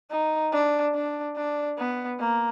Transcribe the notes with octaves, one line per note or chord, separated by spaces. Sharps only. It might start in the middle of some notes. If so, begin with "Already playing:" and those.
D#4
D4
D4
D4
B3
A#3